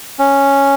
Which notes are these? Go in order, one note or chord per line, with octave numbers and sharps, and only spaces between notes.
C#4